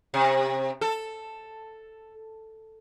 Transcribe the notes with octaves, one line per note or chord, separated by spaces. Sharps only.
C3
A4